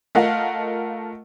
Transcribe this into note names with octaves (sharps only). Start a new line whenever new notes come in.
A3 F4 A#4 D#5 F5 F#5